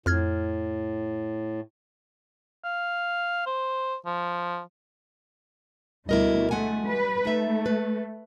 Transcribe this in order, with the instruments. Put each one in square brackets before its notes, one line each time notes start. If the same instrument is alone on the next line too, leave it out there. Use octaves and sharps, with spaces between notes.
[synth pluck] F2 F6 G#6 [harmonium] A2
[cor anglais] F5
C5
F3
[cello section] D2 B2 G3 [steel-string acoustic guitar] E4 A#4 D#5
[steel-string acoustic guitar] G#3 F#5 G#5 [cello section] A3
[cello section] G3 B4
[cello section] A3 [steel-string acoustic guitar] D#4 E5
[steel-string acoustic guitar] B4